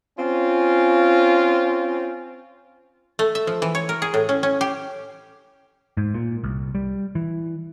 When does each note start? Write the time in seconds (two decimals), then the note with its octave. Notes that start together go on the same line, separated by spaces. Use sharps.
0.19 C4 C#4 F4
3.19 A3
3.35 E5
3.47 F3
3.62 E3
3.75 C#5
3.89 A#4
4.02 G#4
4.14 A2
4.29 C#4
4.43 C#4
4.61 G4
5.97 G#2
6.14 A#2
6.44 C2
6.75 G3
7.15 E3